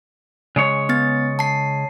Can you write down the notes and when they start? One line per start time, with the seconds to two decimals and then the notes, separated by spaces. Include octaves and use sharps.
0.56 C#3 G#3 C#5
0.89 B3 A6
1.39 A5 C7